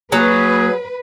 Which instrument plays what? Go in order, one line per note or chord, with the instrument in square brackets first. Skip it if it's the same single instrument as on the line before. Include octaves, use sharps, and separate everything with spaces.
[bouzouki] F#3 [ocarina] A#3 [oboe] G#4 [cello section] B4